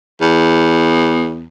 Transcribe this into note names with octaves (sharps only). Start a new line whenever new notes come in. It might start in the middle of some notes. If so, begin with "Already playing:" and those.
E2